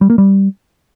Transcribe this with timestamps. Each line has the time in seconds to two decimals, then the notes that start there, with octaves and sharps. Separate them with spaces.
0.01 G3
0.10 A#3
0.18 G3